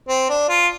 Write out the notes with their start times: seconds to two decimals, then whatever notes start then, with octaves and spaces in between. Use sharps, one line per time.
0.08 C4
0.30 D4
0.49 F4